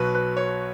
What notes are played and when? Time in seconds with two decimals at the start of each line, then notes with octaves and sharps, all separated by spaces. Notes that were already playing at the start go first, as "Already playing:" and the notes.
Already playing: B1 B2 F#3 B4
0.15 B4
0.37 C#5